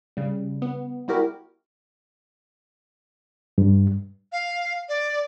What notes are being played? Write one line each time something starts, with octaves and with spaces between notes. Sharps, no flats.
C#3 G3
B3
G3 E4 F#4 G4 A#4
G2
F5
D5